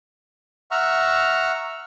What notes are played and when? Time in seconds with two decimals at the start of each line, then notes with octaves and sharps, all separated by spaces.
0.71 E5 F#5 A#5 C#6 F6